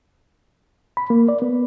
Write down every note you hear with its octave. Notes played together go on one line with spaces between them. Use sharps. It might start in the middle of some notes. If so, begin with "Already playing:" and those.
B5
A#3
D5
B3